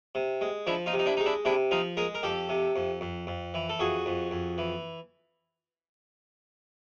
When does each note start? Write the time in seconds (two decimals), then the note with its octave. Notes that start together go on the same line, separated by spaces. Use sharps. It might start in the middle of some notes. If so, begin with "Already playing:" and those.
0.15 C3
0.41 G#3
0.67 F3 D4 E4
0.86 D#4 F4
0.93 C3
0.99 D#4
1.06 D4 E4
1.17 G#3 D#4
1.26 D4 E4
1.45 C3 D4 E4
1.71 F3 D#4 F4
1.97 G#3 G#4 A#4
2.15 A#4
2.23 F2 G4 A4
2.49 C3
2.76 F2
3.01 F2
3.27 F2
3.54 E3
3.69 A4
3.79 F2 F#4 G#4
4.06 F2
4.31 F2
4.58 E3